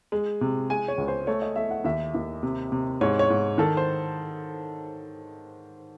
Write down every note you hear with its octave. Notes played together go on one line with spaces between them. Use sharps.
G#3
C3
G#3 G#5
C#5
C#2
C5
A3 C#5
D#5
A3 E5
F#5
D#2 E5
D#2
C3
C3
G#2 C#5
C#5
G#2
D#3 A4
C5